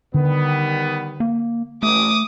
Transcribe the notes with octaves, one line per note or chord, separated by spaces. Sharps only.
D3 D#3 G3 B3
A#3
A1 A3 D6 D#6